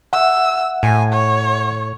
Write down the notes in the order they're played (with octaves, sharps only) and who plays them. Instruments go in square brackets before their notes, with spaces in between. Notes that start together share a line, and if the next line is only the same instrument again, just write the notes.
[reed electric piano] E5 F#5 [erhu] E6
[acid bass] A2 [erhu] G#5
[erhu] C#5